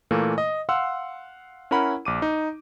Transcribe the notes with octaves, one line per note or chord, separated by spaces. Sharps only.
A#2 E3 A3 A#3
D#5
F5 F#5 C6 E6
C#4 E4 A#4 F#5 B5
A#1 D6 D#7
D#4